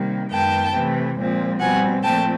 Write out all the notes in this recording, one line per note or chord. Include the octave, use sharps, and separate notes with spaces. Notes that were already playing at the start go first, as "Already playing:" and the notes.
Already playing: C3 D#3 G3 A#3
F#2 D#3 G#3 B3 G5 A5
C3 E3 A3
A#2 F3 G#3 C4
B2 G3 C4 F#5 G#5
A#2 F3 A3 C4 G5 A5